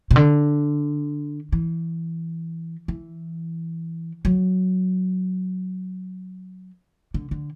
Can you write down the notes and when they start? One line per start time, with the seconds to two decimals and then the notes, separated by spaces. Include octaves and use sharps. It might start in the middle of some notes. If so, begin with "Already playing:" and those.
0.11 B2
0.16 D3
1.52 E3
2.88 E3
4.25 F#3
7.14 D3
7.31 D3